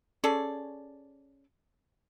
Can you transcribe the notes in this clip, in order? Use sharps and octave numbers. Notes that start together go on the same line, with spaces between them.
C#4 G#4 A4 D5